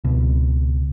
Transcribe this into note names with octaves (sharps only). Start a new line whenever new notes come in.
C#2 B2